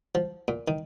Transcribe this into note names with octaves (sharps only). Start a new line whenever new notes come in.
F3
A#2
D#3